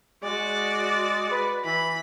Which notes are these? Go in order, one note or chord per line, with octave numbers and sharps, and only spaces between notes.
G#3 F#4 D5
B4
E3 B5